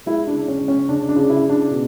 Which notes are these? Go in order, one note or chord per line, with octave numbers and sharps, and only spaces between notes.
G#3 E4
D4
C#3
C#4
C#3
C#4
C#3 D4
D4
C#3
E4
C#3
D4
B2